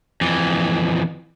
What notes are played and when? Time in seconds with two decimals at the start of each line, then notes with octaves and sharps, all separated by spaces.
0.21 F2 E3